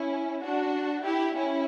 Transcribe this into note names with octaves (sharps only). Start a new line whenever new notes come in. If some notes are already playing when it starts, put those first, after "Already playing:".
Already playing: C#4 E4
D4 F#4
E4 G4
C#4 E4